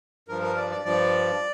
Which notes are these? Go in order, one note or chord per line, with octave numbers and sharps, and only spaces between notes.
G2 F3 A#4
A#4
D5
D5
G2 F3 D5